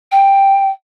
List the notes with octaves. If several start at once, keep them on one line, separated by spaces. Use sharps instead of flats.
G5